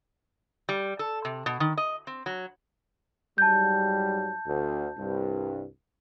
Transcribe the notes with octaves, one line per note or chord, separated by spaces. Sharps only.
G3
A4
C3
B2
D#3
D#5
C4
F#3
G#2 F#3 G3 A5 G6
D2
C2 G2